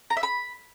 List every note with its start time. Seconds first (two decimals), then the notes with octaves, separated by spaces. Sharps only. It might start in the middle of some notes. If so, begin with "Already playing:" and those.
0.10 A#5
0.17 E5
0.23 B5